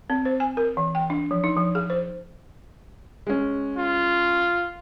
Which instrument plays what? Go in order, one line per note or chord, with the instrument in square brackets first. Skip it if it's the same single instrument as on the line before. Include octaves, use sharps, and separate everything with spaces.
[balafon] C4
C5
G#5
A#4
E3
G5
D4
F3
D#4
F3
G#4
C5
[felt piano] G#3 C#4
[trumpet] F4